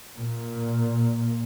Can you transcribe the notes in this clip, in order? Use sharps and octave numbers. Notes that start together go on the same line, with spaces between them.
A#2